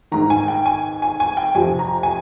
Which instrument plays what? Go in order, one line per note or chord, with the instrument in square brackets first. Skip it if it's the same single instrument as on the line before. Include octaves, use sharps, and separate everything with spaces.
[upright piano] G#2 D#3 A#5
G#5
G5
G#5
G#5
G#5
G5
F2 C3 F3 G#5
A#5
G#5